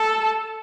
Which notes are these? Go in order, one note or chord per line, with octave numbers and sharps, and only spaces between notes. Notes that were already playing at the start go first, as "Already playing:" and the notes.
Already playing: A4